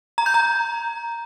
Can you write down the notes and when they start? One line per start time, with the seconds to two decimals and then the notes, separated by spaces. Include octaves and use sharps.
0.18 A#5
0.26 G6
0.34 A#5